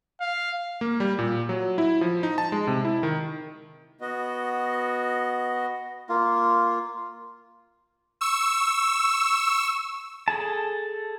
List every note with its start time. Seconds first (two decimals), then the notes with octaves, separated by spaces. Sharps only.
0.21 F5
0.81 A#3
1.00 G3
1.19 A#2
1.49 F#3
1.78 E4
2.01 F3
2.23 D#4
2.38 A5
2.52 G#3
2.67 C3
2.85 E4
3.03 D#3
4.01 B3 F#4 D#5
6.09 A#3 F4
8.21 C#6 E6
10.28 G#4 A4 A5